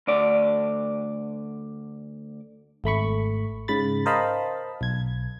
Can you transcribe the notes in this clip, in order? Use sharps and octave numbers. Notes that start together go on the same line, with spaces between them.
D2 D5
G#1 A3 B5 C#6
G#2 C#3 B5 A6
A#4 C5 D#5 F5 A5 B5
B1 G#6